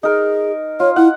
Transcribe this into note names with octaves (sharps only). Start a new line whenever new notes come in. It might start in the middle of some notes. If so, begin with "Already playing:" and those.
D#4 G#4 A#4
F4 C#5
E4 F#5